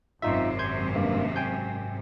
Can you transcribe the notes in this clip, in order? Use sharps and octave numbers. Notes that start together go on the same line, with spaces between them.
G#1 F#2 C3 D#4 F4 E5
C6 G6 G#6
G2 A#3
G5 G#5 G6